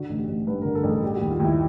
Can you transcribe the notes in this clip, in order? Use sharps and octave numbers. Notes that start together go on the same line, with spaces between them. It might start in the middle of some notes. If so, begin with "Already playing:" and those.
Already playing: D3 F#4
A1
G4
A1
G2 B4
D3 A#4
A4
A1
G#4
G3 G4
F#4
D#2
F4
D#2 E4